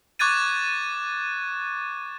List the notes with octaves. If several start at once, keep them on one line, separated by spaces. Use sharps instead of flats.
C#6 D6 F#6 G#6 A6 D#7